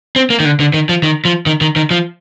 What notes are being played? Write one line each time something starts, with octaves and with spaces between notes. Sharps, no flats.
C4
A#3
D#3
D3
D3
D#3
F3
D#3
F3
D#3
D#3
D#3
F3